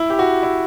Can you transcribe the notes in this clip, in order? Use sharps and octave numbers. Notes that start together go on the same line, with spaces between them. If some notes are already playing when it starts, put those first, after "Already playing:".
Already playing: E4
G4
F#4
E4